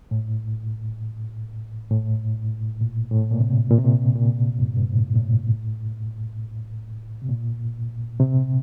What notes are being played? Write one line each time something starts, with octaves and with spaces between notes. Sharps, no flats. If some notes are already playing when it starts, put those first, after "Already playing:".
A2
A2
A#2
A2
A#2
C3
A#2
C3
A#2
A#2
G2
G2
A2
A#2
A2
C3
A#2
C3